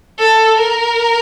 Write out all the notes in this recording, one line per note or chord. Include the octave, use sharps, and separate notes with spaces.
A4
A#4